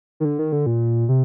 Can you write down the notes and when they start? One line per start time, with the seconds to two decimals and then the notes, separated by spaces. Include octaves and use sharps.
0.20 D#3
0.25 D3
0.39 D#3
0.52 D3
0.66 A#2
1.09 C3